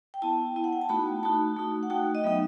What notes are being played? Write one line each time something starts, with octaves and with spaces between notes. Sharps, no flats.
G5
B3 E4 A5
B3 E4
F#5
G5
A5
A3 D#4 F#4 B5
A3 D#4 F#4 A5
A3 D#4 F#4
F#5
A3 D#4 F#4 G5
D#5
F#3 B3 D#4 E5